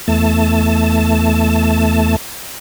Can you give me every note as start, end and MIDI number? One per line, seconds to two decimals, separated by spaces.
0.08 2.16 40
0.08 2.16 57
0.08 2.16 81